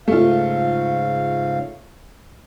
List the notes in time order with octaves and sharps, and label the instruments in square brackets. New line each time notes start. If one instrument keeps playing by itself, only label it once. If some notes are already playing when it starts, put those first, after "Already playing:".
[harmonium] G#2 C#3 F5 [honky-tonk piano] A3 F4